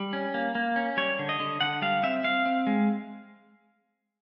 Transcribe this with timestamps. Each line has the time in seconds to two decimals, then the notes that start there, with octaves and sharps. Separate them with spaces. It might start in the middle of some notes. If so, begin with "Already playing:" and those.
Already playing: G3
0.13 C#4
0.34 A#3
0.55 A#3
0.76 C#4
0.97 G3 C#5
1.19 D3
1.29 D#5
1.40 D3
1.61 D3 F#5
1.82 G3 F5
2.03 C4 E5
2.24 C4 F5
2.46 C4
2.67 G#3